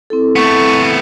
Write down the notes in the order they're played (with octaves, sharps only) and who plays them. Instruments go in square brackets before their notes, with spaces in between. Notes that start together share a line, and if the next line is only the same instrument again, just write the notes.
[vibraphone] C4 E4 A4
[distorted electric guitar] A3 B3 [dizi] C#6